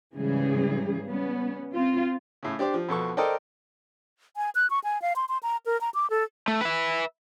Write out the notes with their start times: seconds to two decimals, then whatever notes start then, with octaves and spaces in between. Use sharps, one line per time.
0.13 G#2 C#3 E3 G3 G#4
1.06 G3 B3 C#4
1.74 C4 F4
2.43 A2 C#3
2.59 D4 G4 C5 D5
2.74 F3
2.89 F2 B2 A4 C#6
3.17 A4 A#4 C5 D5 D#5 G5
4.37 G#5
4.55 F#6
4.70 C#6
4.84 G#5
5.02 F5
5.16 C6
5.29 C6
5.43 A#5
5.66 A#4
5.81 A#5
5.94 D6
6.10 A4
6.48 A3
6.61 B4 E5